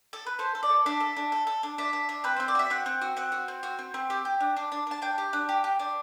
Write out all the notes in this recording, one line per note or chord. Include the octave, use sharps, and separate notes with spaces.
A4
B4
A4 C5
A4
D5
A4
D4 E5
A4
D4
A4
A4
D4
D4 E5
D4
D4
C4 B4
C4 C5
D5
F#4 E5
C4 F#5
C4
F#4
C4 F#5
F#4
C4
F#4
C4
C4
G4
G4
D4
D4
D4
D4 A5
D4 G5
G4
D4
G4
G4
D4